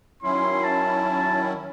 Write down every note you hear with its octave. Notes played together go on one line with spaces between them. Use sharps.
D#3 F#3 C#4 E4 C6
A5